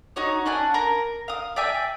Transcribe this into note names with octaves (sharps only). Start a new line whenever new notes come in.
D#4 F#4 C#5
C#4 D4 F#5 G#5
A#4
F5 D#6
D5 E5 G5 G#5